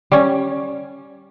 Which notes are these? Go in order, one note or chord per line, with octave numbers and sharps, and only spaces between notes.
G3 C#4